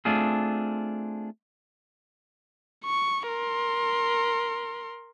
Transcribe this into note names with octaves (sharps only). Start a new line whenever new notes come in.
A3 C4 D4 F4 G#4
C#6
A#4 C6